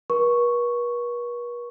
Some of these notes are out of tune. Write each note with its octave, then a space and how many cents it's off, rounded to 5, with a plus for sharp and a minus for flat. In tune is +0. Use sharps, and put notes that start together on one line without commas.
B4 -45 C#6 +0